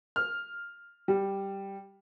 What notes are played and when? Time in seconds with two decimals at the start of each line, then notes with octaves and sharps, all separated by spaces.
0.16 F6
1.08 G3